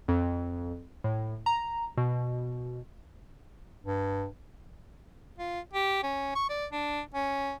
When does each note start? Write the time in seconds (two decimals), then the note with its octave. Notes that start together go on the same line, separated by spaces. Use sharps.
0.08 F2
1.04 A2
1.46 A#5
1.97 B2
3.85 G2
5.38 F4
5.74 G4
6.04 C#4
6.35 C#6
6.50 D5
6.72 D4
7.14 C#4